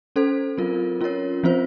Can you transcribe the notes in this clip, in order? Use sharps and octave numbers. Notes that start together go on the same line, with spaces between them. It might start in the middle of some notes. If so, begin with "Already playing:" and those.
C#4 A4 C5
F#3 C4 F4 A#4
C#4 F4 A#4 C#5
F3 C4 F4 C5